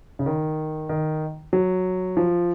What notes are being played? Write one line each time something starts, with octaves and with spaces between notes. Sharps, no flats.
C#3
D#3
D#3
F#3
F3